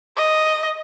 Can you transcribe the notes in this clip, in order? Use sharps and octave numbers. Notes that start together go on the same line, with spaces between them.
D#5